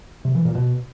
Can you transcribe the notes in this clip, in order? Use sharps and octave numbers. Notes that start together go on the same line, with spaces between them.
C3
E3
A#2
B2